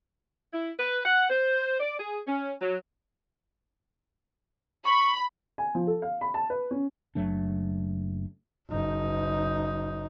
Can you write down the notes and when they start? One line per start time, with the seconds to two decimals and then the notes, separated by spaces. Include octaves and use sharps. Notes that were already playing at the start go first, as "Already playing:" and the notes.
0.53 E4
0.79 B4
1.05 F#5
1.30 C5
1.80 D5
1.99 G#4
2.27 C#4
2.62 F#3
4.86 B5 C#6
5.58 G#5
5.75 F3
5.87 A4
6.02 F5
6.21 B5
6.34 A5
6.50 B4
6.71 C#4
7.15 F#1 F#3 A3 D4
8.69 F#1 D#4